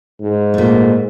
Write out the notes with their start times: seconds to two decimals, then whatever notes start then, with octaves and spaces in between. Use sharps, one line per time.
0.21 G#2
0.54 A#2 A3